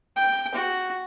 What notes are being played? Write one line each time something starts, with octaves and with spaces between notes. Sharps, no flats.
G5
F#4